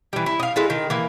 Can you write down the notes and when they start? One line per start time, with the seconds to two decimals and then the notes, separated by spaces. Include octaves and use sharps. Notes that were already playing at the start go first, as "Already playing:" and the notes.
0.13 E3 G3
0.26 E4
0.40 D#5 F5
0.56 G#3 E4 A4
0.70 D#3
0.90 E3 A#3